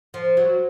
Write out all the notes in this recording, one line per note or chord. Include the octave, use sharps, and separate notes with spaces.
F3
F#3